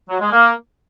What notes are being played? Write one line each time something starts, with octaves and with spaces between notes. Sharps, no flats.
F#3
G#3
A#3